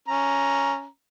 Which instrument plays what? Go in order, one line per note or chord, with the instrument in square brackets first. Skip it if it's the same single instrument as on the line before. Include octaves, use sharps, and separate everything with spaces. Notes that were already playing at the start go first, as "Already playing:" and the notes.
[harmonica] C#4 A#5